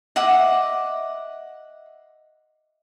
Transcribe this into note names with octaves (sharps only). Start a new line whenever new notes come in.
D#5 E5 F#5 D6